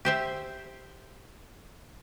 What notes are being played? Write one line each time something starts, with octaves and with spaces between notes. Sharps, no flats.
G4 C5 E5